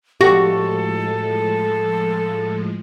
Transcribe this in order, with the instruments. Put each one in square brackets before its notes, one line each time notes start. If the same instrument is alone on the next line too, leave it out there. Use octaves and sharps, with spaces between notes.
[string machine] A2 F3 G#3 [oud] F#4 [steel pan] G4 [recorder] A4